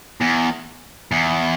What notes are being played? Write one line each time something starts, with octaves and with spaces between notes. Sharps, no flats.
E2
E2